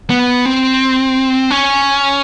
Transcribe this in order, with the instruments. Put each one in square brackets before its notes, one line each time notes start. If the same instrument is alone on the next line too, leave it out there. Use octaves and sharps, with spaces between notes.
[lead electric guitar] B3
C4
C#4